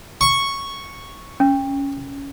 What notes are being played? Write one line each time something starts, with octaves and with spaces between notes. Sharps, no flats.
C#6
C#4